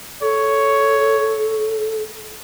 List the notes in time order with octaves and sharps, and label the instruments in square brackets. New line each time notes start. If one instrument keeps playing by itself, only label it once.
[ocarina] A4 [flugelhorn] C#5